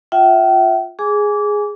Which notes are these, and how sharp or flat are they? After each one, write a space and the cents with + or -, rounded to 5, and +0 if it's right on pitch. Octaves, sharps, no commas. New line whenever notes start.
F4 +15 E5 +0 G5 -40
G#4 +0 G#5 +0 D6 -25